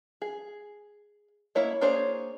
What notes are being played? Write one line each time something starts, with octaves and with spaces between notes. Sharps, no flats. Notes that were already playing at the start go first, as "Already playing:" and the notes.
G#4
A#3 E4 C#5 D#5
A#3 D4 G#4 C5 C#5